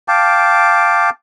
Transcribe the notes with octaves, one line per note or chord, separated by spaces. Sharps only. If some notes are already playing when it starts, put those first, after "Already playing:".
F5 G5 A5 D6